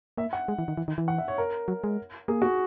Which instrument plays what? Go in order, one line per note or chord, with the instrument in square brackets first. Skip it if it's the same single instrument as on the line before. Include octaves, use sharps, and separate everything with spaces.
[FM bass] A#3 [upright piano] E5
[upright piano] F#5
[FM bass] G#3
E3
D#3
E3
D#3
E3
[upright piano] F#5
E5
C#5
A#4
[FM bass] F#3
G#3
[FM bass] A#3 [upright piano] G#4
[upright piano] F#4